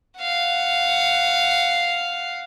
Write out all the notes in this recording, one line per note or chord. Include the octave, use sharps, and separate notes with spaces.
F5 F#5